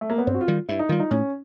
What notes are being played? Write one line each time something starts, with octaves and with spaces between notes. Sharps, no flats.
A3
A#3
B3
G2 C4
F#4
F4
D#3 G3
G2 E4
D#4
D#3 G3 F4
D#4
A2 C#4